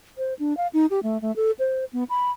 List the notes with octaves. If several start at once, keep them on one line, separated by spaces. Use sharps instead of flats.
C5
D4
F5
D#4
G4
A3
A3
A4
C5
B3
B5